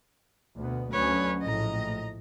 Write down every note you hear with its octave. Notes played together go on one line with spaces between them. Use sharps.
D2 B2 B3
D2 F#3 C#4 B4 C#5
A#1 A2 D#5 A#5